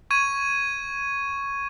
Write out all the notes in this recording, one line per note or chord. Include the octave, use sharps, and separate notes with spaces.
C#6 G#6 D#7